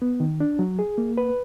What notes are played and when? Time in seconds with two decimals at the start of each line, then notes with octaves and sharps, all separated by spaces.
0.02 B3
0.20 D#3
0.40 D4
0.59 F#3
0.79 G#4
0.98 A#3
1.17 B4